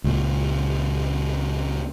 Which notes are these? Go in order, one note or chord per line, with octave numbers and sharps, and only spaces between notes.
C#2 A#2